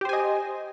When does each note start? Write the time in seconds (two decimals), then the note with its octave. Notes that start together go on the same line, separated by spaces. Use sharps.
0.01 G4
0.05 C5
0.09 G#5
0.13 D#5